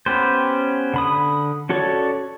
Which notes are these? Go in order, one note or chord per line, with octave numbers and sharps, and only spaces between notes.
B3 C#4 G4 B4 C5
D3 B5 D#6
C#4 F#4 A4 C#5 D5